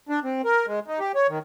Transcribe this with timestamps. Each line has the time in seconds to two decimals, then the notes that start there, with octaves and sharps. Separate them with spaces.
0.09 D4
0.24 C4
0.44 A#4
0.67 G#3
0.88 D#4
1.00 G4
1.15 C#5
1.29 D#3